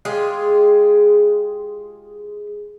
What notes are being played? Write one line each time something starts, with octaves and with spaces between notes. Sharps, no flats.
G#3 F4 G4 G#4